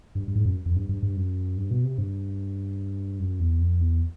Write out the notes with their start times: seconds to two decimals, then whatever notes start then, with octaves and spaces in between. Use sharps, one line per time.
0.15 G2
0.28 G2
0.35 G#2
0.45 F#2
0.66 F2
0.76 G2
0.89 G2
1.03 G2
1.16 F#2
1.57 G2
1.71 B2
1.84 C3
1.98 G2
3.19 F#2
3.40 E2
3.61 F2
3.80 E2